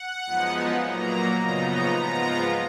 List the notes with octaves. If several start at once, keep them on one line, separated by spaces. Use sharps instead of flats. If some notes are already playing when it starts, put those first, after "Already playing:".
Already playing: F#5
F#2 F3 G#3 B3 D#4
A#2 F#3 A#3 A#5
F#2 C#3 F3 B3 D#4 A#5
A#5
G#2 F3 G#3 B3 F4 A#5